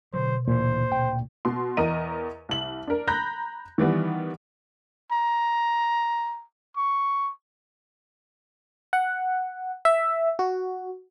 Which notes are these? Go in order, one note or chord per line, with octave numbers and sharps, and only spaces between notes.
B2 D3 F#3 C5
D2 A#2 E3 C5
D2 A#2 G5
B2 C6
E2 A#4 D#5 A#5 D#7
C2 F#7
D4 A#4
A#5 B5 F#6 G6 A#6
D#3 E3 G3 B3
A#5
C#6
F#5
E5
F#4